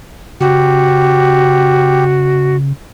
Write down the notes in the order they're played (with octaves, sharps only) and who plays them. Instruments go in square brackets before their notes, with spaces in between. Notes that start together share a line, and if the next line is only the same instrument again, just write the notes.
[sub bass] C#3 [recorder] F#4 [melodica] G4